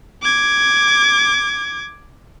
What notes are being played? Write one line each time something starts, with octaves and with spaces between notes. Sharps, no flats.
D6 G#6